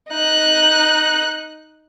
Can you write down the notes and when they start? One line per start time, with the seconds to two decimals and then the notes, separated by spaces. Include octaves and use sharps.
0.10 D#4 F#6